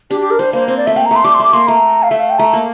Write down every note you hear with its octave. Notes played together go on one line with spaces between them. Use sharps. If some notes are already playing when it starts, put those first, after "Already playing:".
D4 G4
G4
A#4
G3 C5
A#3 C5
C4 C5
D5
A3 E5
A#3 G5
A#5
A3 C6
G3 D6
C6
A3 D6
A#3 C6
A3 A#5
F5
A3 E5
F5
G5
A3 A#5
A#3